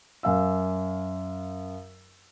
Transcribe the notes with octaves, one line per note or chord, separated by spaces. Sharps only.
F#2 F5 E6